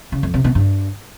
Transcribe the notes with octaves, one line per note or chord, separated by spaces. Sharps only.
C#3
F2
C3
B2
G2